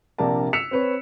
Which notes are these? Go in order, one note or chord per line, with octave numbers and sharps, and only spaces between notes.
A#1 C3 D4 A#4 A5
E6 B6 C#7 E7 F7
C4 B4 C#5